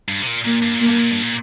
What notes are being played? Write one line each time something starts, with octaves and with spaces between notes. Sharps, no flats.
G2
C3
A#2
A#2 A#3
G2
A#2
A#3
G2
A#2
G2
A#2